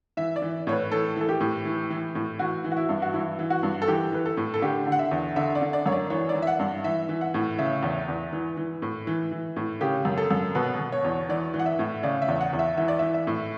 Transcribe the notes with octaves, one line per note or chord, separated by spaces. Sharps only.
E3 E5
D5
E3
A2 C#5
B4
E3 A4
E3 A4
G4
A2
E3
E3
A2
E3 F#4
E3
F#4
E4
G2
F#4
E3 E4
E3
F#4
G2
A4
E3 G4
E3 B4
A4
A2
A4
D3 G4
D3
F#5
E5
E2
D3 E5
D5
D3
D5
F#2 C#5
D5
E3 C#5
D5
E3
E5
F#5
G2
E3 E5
E3
F#5
A2
C#3 E5
E2
E2
E3
E3
A2
E3
E3
A2
C#3 G4
F#2
A4
F#2
B2 B4
B2
C#5
E2
E3 D5
E3
F#5
E5
A2
C#3 D5
E5
E2
F#5
E2
E5
E3 E5
D5
E3 E5
E5
A2